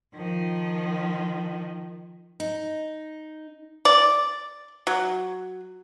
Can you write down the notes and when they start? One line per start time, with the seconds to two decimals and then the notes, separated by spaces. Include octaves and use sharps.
0.15 D#3 F3
2.40 D#4
3.85 D5
4.87 F#3